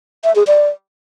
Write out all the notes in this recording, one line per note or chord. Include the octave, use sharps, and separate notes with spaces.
E5
G#4
D5